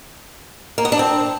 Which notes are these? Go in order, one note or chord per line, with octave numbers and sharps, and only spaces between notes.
A#3
B3
D4
C4